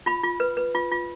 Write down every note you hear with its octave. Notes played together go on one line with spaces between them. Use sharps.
F4 B5
F4
B4
B4
F4
F4